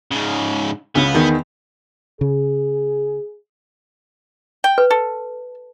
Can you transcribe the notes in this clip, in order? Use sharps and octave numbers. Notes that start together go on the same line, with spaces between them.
G#2 C#3
C#2 C#3 B3
E2 D#3
C#3 G#4
G5
B4
A4